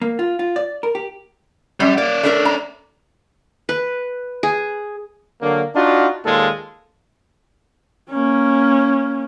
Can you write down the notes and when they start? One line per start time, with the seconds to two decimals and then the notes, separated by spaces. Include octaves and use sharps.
0.02 A#3
0.19 F4
0.39 F4
0.56 D5
0.83 A#4
0.95 G4
1.80 F#2 G3
1.98 A#3 C#4 D5
2.23 A3 D4 A#4
2.45 A#5
3.69 B4
4.43 G#4
5.41 D3 F#3 A#3
5.75 D4 D#4 F4 F#4
6.24 D#2 A#2 G#3 F4 A4
8.10 A#3 C#4